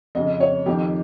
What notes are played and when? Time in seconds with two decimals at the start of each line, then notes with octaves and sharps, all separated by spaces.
0.15 F2 C#3 D#5
0.40 C#5
0.66 F2 D#3 G4